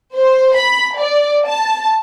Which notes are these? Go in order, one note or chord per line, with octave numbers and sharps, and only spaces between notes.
C5
B5
D5
A5